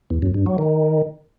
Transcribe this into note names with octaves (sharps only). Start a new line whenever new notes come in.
E2
F#2
G2
F#3
D#3